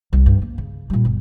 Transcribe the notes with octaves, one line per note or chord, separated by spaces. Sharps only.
C2
G2
A#3
C#3
A#2 G3
G1